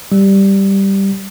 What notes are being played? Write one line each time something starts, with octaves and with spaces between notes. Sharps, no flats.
G3